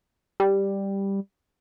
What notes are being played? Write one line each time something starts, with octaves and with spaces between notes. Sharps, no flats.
G3